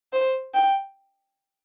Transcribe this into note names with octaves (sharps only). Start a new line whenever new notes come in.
C5
G5